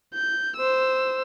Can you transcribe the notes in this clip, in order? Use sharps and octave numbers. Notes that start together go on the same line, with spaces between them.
G6
C5 E6